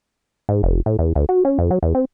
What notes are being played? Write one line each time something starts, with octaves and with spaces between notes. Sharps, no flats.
G#2
F1
A2
E2
D2
F#4
C#4
F2
F#3
E2
C4